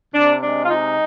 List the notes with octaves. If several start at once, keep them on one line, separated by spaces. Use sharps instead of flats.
C3 D4
G#3 D4
F4
C3 D#4